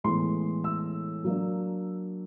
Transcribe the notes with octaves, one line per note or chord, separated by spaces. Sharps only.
A2 E3 G#3 B3 C6
E6
F#3 A#3 D4